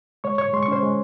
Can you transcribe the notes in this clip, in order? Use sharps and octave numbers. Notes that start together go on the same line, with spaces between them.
G#3 C#5 C#6
G#2 C#5 C#6
G#3 C6
C#6
C#4 C5 C6
G#3